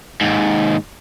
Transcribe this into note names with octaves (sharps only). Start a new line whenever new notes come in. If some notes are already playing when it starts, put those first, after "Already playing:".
D#2 G#2